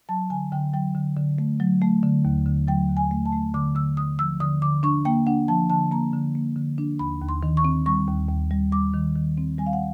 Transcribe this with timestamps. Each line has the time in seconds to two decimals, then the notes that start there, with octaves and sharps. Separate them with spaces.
0.09 F#3 A5
0.30 D3 G#5
0.52 D3 G5
0.73 F#3 G5
0.95 D3
1.16 D3
1.38 A3
1.60 F#3
1.82 A3
2.03 D3
2.25 D#2
2.46 D3
2.68 F#3 G5
2.89 D#2
2.97 G#5
3.11 A3
3.26 A5
3.33 A3
3.54 D3 D6
3.75 D3 E6
3.97 D3 D#6
4.19 F3 E6
4.40 D3 D#6
4.62 D3 D6
4.83 D4 C#6
5.05 A#3 G5
5.26 D4 F#5
5.48 F3 A5
5.70 D3 A5
5.91 A#3 A#5
6.13 D3
6.35 A#3
6.56 D3
6.78 D4
6.99 D#2 B5
7.21 D#2
7.29 C6
7.43 D#3
7.57 C#6
7.65 C4
7.86 G3 C#6
8.08 D#2
8.29 D#2
8.51 G3
8.72 G3 D6
8.94 D#3
9.15 D#3
9.38 C4
9.59 G3 G#5
9.66 F5
9.73 F#5